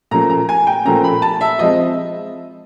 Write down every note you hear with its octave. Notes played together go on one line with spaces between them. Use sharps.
A#2 F3 A3 C#4 A#5
A#5
G#5
G5
A#2 F3 A3 C#4 A#5
B5
A5
E5
F3 G#3 C4 D#5